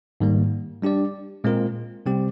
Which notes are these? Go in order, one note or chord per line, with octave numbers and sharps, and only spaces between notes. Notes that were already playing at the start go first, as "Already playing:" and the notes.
G#2 D#3 G3 A#3
G3 D4 G4 D5
A#2 G#3 C4 F4 A#4
C3 G3 C4 G4